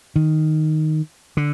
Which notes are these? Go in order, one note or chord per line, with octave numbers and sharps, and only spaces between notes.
D#3
D3